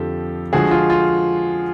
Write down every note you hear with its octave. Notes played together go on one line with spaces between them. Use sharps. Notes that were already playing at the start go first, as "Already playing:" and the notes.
Already playing: F2 D3 F3 G4 A4
D3 F3 G#3 F#4 G#4
F4
F4